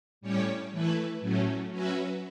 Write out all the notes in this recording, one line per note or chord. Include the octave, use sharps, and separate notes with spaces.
A2 G3 C#4 G4 C#5
E3 A3 E4 B4
A2 F#3 A3 C#4
F#3 C#4 F#4 B4 E5